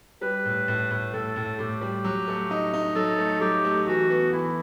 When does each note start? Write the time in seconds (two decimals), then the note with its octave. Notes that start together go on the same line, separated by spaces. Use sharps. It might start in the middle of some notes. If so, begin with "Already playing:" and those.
0.21 G3 B4
0.45 A2
0.68 A2
0.91 A2
1.13 A2 A4
1.36 A2
1.59 A2 G4
1.81 G3
2.04 F#3
2.28 A3
2.51 D#4
2.73 D#4
2.95 F#3 A4
3.18 A3
3.41 F#3 G4
3.65 A3
3.87 E3 F#4
4.10 B3
4.33 E3 E4